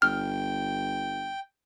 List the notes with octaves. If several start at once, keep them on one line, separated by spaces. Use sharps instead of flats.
G1 G5 F6